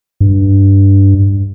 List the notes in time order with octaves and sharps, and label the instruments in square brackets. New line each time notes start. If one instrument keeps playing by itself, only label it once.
[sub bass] G2